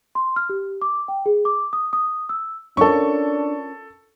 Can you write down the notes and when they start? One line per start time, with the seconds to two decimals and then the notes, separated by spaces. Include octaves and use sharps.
0.15 C6
0.36 F6
0.50 G4
0.82 D6
1.08 G5
1.26 G#4
1.45 D6
1.73 D#6
1.93 D#6
2.29 E6
2.77 C#4 D4 F4 A4 A#4 C#6